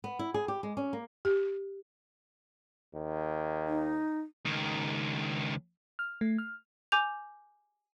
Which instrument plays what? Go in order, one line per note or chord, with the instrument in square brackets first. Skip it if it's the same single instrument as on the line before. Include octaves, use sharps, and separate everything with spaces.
[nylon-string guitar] B3
E4
G#4
G4
G#3
C#4
A#3
[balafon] G4
[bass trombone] D#2
[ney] D#4
[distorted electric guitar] C#2 D#3
[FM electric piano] F6
A3
F6
[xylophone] G#5 D6 G6 F7